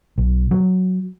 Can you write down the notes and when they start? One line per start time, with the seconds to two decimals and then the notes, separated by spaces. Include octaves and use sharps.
0.18 B1
0.51 F#3